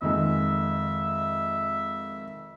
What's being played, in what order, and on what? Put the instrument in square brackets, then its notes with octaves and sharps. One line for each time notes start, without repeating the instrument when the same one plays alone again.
[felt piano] F2 D#3 G#3 [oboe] E5